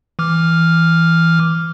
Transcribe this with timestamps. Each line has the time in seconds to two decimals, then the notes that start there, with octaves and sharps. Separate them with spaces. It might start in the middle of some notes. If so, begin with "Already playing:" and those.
0.19 E3 D6 F6